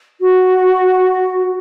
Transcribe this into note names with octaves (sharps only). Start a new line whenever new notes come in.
F#4